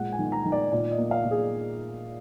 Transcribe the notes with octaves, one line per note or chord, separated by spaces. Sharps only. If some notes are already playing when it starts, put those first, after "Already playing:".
Already playing: A#2 G#3 F#5
G#5
D#3
A#5
D#3
D5
A#2 D5
D#5
A#3
F5
A#2
G#4